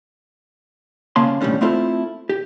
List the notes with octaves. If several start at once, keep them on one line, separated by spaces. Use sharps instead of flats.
C2 C#3 A#3 C#5 A5 C6
D#2 A2 C#3 G3 C#4 D4
A3 C4 E4 F4 A4
G4